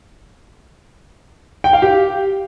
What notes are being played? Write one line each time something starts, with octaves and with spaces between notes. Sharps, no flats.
G5
F5
G4